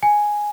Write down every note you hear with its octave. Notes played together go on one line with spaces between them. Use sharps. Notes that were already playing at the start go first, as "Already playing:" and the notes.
G#5